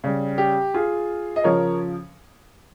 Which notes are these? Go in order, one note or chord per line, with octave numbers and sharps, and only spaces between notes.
C#3 G3
G4
F4 G#4
D#5
C#3 F3 A#4 C#5